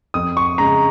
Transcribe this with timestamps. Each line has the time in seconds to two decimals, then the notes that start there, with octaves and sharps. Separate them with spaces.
0.14 F2 D#6
0.37 C#6
0.58 C#3 G#3 A#5